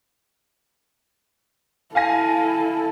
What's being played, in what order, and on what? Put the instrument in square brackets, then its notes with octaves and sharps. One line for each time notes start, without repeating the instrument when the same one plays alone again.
[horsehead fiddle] E4 A4 [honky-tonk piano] F5 G#5 A#6